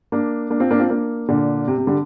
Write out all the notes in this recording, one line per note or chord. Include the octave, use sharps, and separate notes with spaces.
A#3 D4
A#3 D4
C4 F4
A#3 D4
C4 F4
A#3 D4
A#2 D3
C3
C3
D3 G3